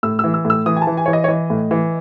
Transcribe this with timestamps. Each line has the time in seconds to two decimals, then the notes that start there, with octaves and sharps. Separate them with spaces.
0.03 A2 E6
0.19 E3 E6
0.34 E6
0.45 A2
0.50 E6
0.66 E3 D#6
0.77 G#5
0.82 A5
0.87 E3
0.97 G#5
1.06 E3 C#5
1.13 D#5
1.24 C#5
1.28 E3 D#5
1.50 A2
1.71 E3